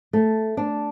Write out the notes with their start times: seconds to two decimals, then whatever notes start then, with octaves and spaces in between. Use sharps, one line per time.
0.13 A3
0.57 D4